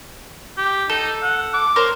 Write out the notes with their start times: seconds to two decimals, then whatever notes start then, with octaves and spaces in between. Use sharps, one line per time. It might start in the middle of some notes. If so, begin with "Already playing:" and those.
0.57 G4
0.90 D#4 A4
1.23 F#5
1.54 D6
1.76 A#4 C5 C#5